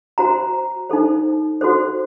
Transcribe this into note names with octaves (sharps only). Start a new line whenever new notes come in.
F#4 C5 A#5
D#4 A4 C5
F#4 A4 C5